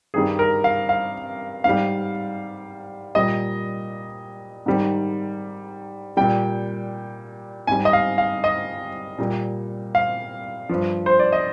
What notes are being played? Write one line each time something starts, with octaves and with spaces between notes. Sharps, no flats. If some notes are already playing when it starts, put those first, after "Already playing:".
G2 D#3 G3 G#4
A#4
F5
F5
G#2 G3 F5
A#2 G3 D#5
G#2 D#3 G3
A#2 G3 G5
G#2 G3 G#5
D#5
F5
F5
D#5
A#2 G3
F5
G2 F3
C5
D5
D#5